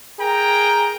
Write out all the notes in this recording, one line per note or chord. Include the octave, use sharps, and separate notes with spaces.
G#4 A#4 G5 A#5